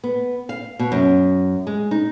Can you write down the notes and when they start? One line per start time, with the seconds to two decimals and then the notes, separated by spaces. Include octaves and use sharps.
0.04 B3
0.49 F5
0.79 B2
0.92 F#2
1.67 G#3
1.91 D#4